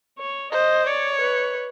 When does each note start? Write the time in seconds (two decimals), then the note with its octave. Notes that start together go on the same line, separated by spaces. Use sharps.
0.18 C#5
0.52 C5 D#5
0.87 C#5 D5
1.20 B4